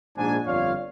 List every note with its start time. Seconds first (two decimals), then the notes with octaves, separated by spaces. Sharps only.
0.17 A#1 G#2 D4 G#5
0.46 G1 F2 F4 C#5 D5 F5